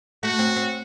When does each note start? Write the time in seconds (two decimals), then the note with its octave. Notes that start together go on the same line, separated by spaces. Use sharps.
0.23 A3 F#4
0.39 C4
0.56 C4